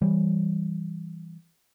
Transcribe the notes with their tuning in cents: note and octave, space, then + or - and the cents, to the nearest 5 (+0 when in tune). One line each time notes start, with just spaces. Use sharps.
E3 +0 G3 +0